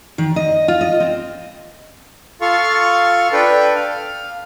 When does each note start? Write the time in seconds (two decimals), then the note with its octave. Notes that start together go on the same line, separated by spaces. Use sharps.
0.18 D#3
0.36 D#5
0.68 F4
0.81 D#5
1.00 C4
2.41 F4 A4 F5 C6 C#6
3.33 D4 A4 B4 G5
3.75 F5